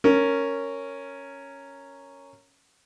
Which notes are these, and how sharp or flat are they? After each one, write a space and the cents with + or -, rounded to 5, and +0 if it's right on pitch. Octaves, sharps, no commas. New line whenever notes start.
C#4 +0 A#4 -10